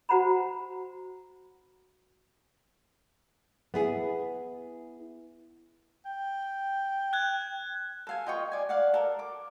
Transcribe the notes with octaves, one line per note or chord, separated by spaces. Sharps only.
F#4 C5 F#5 A#5 B5
B3 E4 G#4
G5
F#6 G#6
A4 F5 G#5
F4 D#5 G5 C#6
D5 G#5
D5 F5 F#5
A4 A#4
D6